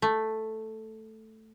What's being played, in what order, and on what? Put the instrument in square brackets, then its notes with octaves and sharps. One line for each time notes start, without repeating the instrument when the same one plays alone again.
[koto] A3